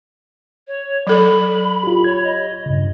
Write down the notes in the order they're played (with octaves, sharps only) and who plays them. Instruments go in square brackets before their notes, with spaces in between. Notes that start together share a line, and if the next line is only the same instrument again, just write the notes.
[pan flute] C#5
[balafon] F#3 A4 [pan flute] B5
[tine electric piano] F4 G4
[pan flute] C#5 [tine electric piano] G#6
[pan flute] D#5
[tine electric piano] G2 C#3